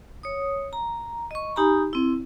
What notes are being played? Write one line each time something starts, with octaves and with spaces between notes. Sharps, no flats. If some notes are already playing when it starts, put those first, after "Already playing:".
C#5 D#6
A#5
D#5 C#6
D#4 G4 G#5 A#5 B5
C4 E4